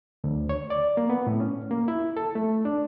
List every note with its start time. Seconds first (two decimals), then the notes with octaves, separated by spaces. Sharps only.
0.24 D2
0.49 C#5
0.70 D5
0.97 A#3
1.10 B3
1.27 A2
1.40 C#4
1.71 A#3
1.88 E4
2.17 A4
2.35 A3
2.65 D4